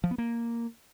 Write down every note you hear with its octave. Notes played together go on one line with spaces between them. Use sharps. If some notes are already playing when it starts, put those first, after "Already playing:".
F3
B3
A#3